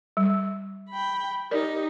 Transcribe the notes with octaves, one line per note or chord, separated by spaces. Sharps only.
G3
G5 B5
D#4 G4 A#4 D5